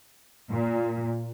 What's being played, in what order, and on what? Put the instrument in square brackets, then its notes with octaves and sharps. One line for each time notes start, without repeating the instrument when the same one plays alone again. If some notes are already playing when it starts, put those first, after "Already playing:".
[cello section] A#2